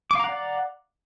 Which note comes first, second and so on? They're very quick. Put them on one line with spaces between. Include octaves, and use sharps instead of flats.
D6 F5 A#5 F#5 D5